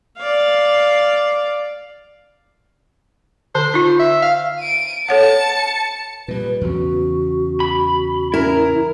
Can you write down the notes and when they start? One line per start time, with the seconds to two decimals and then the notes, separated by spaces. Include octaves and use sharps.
0.19 D5 F5
3.55 D3 C5
3.74 D#4 F4
4.00 E5
4.22 F5
4.60 D7 D#7
5.09 A4 C#5 F#5 A5 C#7
6.28 A#2 G3 B4
6.61 E2 C#3 F#4
7.60 B5
8.34 C#4 E4 A#4